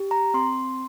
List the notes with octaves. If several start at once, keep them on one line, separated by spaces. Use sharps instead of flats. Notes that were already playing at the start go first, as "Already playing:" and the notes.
Already playing: G4
A#5
C4 C6